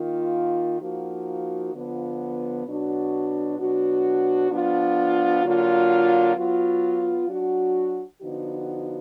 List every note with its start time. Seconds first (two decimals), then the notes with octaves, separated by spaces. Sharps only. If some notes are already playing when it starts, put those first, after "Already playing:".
Already playing: D#3 A#3 F4
0.81 F3 A#3 D#4 F#4
1.74 D3 F3 B3 F4
2.66 B2 F#3 D4 F#4
3.59 B2 F#3 D4 F#4
4.51 F3 B3 D4 F4
5.44 D3 F#3 A#3 F4
6.36 F#3 B3 F4
7.28 F#3 D4 F#4
8.21 D3 F3 B3 D#4 F#4